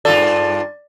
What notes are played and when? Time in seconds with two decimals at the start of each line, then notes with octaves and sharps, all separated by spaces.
0.05 G2 F4 A4 D5